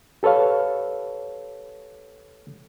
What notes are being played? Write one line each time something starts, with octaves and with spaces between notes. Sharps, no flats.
G4 A4 B4 C#5 F5